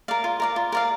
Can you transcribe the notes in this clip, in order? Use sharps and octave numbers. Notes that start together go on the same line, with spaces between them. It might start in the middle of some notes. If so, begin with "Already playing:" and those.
A#4 D5 F5
F4
A#4 D5 F5
F4
A#4 D5 F5